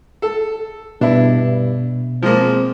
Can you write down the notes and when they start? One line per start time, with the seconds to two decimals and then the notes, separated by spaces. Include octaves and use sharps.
0.22 A4
1.01 G2 B2 D4 E4
2.22 F3 G#3 A#3 C4